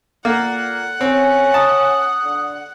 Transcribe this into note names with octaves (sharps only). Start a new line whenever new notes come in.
A#2 A#3 A4 F#5
C4 C#4
A5 D#6
D3